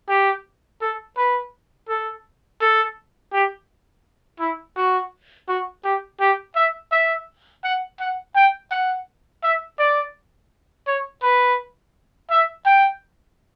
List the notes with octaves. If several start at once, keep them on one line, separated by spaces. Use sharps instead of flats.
G4
A4
B4
A4
A4
G4
E4
F#4
F#4
G4
G4
E5
E5
F#5
F#5
G5
F#5
E5
D5
C#5
B4
E5
G5